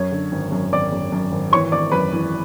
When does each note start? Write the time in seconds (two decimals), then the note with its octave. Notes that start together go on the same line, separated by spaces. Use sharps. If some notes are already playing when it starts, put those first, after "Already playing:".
Already playing: F#2 C#5
0.12 D3
0.32 G#1
0.52 F#2
0.73 G#1 D5 D6
0.92 F#2
1.12 F#2
1.32 G#1
1.52 E3 C#5 C#6
1.72 G#1 D5 D6
1.92 F#2 B4 B5
2.13 E3